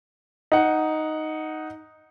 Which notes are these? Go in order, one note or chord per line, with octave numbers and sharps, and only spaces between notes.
D#4 F#5